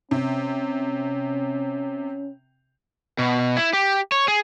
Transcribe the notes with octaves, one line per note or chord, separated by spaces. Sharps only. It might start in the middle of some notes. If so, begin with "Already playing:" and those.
C3 C#4
B2
E4
G4
C#5
G#4